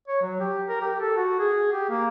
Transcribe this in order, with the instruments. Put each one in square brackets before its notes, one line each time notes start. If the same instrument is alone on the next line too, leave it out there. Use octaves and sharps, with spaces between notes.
[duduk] C#5
F#3
G4
A#4
G4
A4
F#4
G#4
G4
A#3